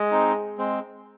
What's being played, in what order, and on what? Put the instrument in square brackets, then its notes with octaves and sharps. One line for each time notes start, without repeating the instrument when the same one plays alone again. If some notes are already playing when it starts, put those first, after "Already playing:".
Already playing: [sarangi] G#3
[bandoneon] C4 D#4
G#3 C4